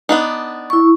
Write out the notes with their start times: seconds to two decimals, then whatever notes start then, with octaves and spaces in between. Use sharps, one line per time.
0.09 B3 D4 D#4
0.70 E4 C#6